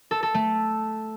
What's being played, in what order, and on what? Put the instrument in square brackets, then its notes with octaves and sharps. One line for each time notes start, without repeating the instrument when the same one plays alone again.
[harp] A4
A4
A3